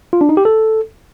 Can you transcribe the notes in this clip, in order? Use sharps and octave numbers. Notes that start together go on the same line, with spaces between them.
F4
D4
D#4
G4
A4